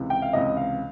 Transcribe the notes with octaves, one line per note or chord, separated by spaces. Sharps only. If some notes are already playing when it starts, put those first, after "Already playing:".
Already playing: C#2 C3 E3
G5
F5
C#2 C3 E3 D#5
F5